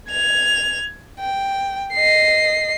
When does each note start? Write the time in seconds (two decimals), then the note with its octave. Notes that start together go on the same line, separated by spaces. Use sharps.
0.11 G#6 F7
1.20 G5
1.94 D#5 C7